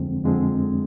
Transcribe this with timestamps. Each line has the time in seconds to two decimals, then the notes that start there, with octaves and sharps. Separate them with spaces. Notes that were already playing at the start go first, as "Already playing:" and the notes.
Already playing: F2 D3 F3 G#3 C4
0.24 F2 D3 F3 G#3 C4